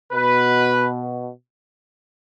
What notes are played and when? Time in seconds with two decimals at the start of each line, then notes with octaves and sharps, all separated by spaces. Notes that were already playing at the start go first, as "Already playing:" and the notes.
0.12 B2 B4